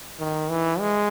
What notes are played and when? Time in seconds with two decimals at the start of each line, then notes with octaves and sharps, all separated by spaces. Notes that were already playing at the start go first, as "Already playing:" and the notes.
0.19 D#3
0.49 E3
0.80 G#3